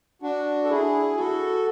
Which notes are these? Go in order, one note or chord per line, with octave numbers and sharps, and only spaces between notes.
D4 F#4
A4
E4 G#4
F#4 A4